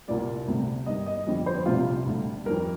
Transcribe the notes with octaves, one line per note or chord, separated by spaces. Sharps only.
C2 A#2 G3 D5
D2 C3 G3
G2 D#3 G3 D#5
D#5
F2 D3 G3
C5
C2 C3 G3 F4
D2 D3 G3
F2 D#3 G3 A#4